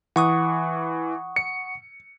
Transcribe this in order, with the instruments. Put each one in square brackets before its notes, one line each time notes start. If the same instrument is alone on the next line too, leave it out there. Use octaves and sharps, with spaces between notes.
[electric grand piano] E3 [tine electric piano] F#5 C#6 D#6
[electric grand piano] C#7